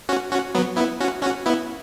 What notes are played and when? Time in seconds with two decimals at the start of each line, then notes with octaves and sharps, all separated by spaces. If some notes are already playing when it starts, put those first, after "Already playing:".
0.09 C#4 F#4
0.31 C#4 F#4
0.55 F#3 B3
0.77 B3 E4
1.01 C#4 F#4
1.22 C#4 F#4
1.46 B3 E4